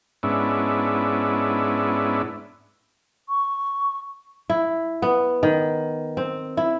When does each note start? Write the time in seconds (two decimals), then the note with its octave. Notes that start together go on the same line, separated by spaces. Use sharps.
0.23 G#2 B3 C#4 D4 E4
3.29 C#6
4.50 E4
5.02 B3
5.43 D#3
6.17 C4
6.57 E4